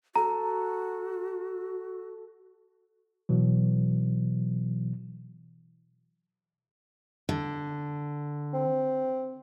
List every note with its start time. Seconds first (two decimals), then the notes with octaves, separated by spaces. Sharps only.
0.16 F#4 A4 A#5
3.29 B2 E3 F#3
7.29 D3
8.54 C4